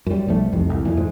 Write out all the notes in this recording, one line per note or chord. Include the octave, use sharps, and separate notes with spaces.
F#2 G3
B1 F3 G3 A3
C2 F2 G#2 C3
C2
F2 A#2 E3
G#2